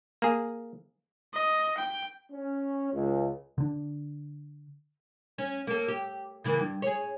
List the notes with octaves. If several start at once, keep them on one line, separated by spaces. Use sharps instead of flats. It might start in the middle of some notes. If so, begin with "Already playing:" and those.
A#3 G#4
D#5
G5
C#4
C#2
D3 D4
C#4
A#3 A4
G4
C#3 E3 A#3
G2
G#4 C#5